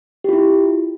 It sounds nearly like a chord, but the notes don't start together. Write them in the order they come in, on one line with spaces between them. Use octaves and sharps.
G4 F4 E4